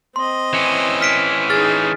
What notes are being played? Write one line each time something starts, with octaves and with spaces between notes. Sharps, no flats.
C4 D#5 C6
E3 C#4
F6 B6 D7
D#4 G#4 F6 A6